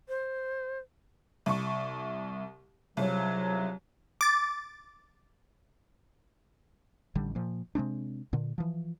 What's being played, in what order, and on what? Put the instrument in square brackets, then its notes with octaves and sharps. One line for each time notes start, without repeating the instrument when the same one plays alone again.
[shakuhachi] C5
[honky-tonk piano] C2 C#6
[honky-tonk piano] C2 [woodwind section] C#3 F3 F#3
[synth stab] D6 A6
[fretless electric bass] A1 D3 G3
A#2 F3
C3 G#3 C4 D4
A#2 D3
E3 F3